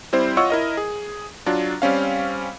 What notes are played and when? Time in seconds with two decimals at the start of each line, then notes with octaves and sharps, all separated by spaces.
0.13 G3 C4 E4 C5
0.37 F4 C#5 D#5 F#5 C#6 E6
0.50 E4 A#4 D#5
0.77 G#4
1.46 F#3 D4 F4
1.82 G3 C4 C#4 F5